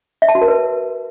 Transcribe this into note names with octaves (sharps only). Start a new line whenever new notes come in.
E5
A5
F#4
A#4
B4